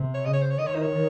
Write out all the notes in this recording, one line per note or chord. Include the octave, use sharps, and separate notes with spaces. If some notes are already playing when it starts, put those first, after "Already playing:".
Already playing: C3
C#5
C#3 D#5
C#5
C5
C#5
D#3 D#5
C#5
D#4
C#5